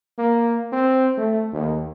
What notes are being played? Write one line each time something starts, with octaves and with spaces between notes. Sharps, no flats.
A#3
C4
A3
D#2